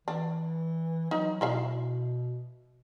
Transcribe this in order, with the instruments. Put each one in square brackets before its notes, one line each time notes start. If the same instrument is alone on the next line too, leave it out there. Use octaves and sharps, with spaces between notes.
[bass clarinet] E3 [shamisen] D4
[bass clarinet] F#3 [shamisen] D#4
[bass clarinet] B2 [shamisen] E4 E5 F5